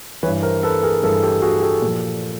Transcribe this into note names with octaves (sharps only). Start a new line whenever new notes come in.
E3 B4 C#5
G2
A#4 C5
A4 B4
G#4 A#4
G2 E3 A4 B4
G4 A4
F#4 G#4
G4 A4
A#2
F3